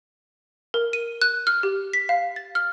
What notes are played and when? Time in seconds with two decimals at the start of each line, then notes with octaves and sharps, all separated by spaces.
0.74 A#4
0.93 D#7
1.22 F#6
1.47 F6
1.63 G4
1.93 B6
2.09 F5
2.36 A6
2.55 F6